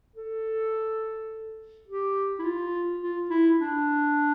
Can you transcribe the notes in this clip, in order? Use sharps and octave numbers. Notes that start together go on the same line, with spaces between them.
A4
G4
E4
F4
F4
E4
D4